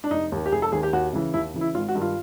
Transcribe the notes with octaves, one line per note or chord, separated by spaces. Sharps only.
D4
F1 D#4
D#2 D#3
G4
F1 G#4
A4
D#2 D#3 G#4
G4
D#2 F#4
C#3 E3
D#2 E4
C#3 E3
E4
G#1 F4
F#4
G2 D#3
F4